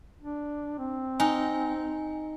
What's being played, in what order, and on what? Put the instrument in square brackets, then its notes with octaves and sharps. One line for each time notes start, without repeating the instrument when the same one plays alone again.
[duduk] D4
C4
[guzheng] D#4 [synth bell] G#5